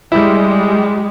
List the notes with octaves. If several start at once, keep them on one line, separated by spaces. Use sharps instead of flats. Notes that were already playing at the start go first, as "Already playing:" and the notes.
G3 G#3 E4